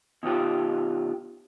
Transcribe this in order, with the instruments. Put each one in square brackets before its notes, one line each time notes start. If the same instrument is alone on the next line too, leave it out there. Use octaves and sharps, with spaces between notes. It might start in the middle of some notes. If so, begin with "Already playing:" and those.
[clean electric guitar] B2 D#3 F4 G4